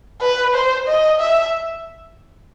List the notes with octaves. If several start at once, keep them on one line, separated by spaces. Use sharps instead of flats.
B4
C5
D#5
E5